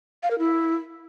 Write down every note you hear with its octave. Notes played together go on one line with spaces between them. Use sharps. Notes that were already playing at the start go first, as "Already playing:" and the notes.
F5
A#4
E4